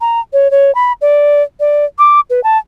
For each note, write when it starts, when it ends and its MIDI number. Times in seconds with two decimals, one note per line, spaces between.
0.01 0.20 82
0.33 0.50 73
0.51 0.74 73
0.75 0.93 83
1.02 1.43 74
1.60 1.85 74
1.99 2.20 86
2.30 2.43 71
2.44 2.58 81